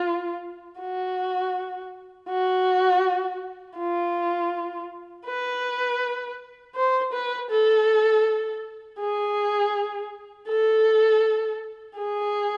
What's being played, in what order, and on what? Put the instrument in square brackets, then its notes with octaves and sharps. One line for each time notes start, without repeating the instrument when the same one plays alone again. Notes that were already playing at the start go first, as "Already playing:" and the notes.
Already playing: [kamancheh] F4
F#4
F#4
F4
B4
C5
B4
A4
G#4
A4
G#4